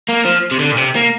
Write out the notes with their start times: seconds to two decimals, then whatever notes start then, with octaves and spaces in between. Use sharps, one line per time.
0.09 A#3
0.25 F3
0.52 C3
0.60 D3
0.72 A#2
0.77 C3
0.95 A#3